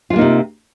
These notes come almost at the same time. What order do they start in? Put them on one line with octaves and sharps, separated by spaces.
F4 G#3 A#3 D#4 C3